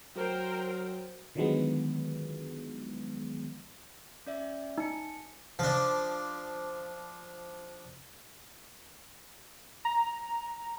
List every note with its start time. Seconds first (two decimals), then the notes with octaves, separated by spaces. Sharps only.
0.16 F#3 A#4 C5 G5
1.35 D3 D#3 F3 F#3 G#3 B3
4.26 C#4 D5 E5
4.78 D#4 G#5 A5 C#7
5.59 F3 D4
9.85 A#5